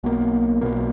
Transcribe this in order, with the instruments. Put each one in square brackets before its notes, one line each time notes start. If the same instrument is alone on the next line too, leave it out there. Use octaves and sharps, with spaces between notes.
[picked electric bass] B1 B2 A#3
B1 B2 A#3